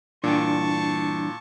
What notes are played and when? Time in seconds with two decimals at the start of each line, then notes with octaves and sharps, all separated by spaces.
0.24 G2 A#2 E3 D4 G5 A5 C#6